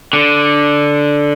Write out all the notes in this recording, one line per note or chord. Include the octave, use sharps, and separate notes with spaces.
D3